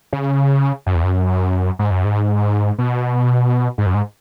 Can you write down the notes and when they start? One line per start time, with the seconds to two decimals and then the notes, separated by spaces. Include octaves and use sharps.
0.13 C#3
0.86 F#2
0.95 E2
1.03 F#2
1.79 G#2
1.91 F#2
2.05 G#2
2.78 B2
3.78 G#2
3.86 F#2
3.94 G#2